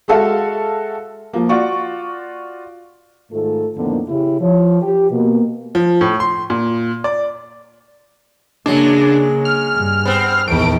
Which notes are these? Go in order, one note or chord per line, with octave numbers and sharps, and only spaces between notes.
G#3 F#4 A4 E5 F5
F3 A#3
F4 F#4 D5 C#6
G#2 D#3 A3 F4 A4
F2 A2 D3 D#3 A#3 B3
C#3 E4 G4
F3 C#5
G4
B2 A#3
F3
A2
C6
A#2
D5
C#3 F#3 G#3 A#3 D4
F6
G2
B3 C4
A#1 E2 D#3 A3 D7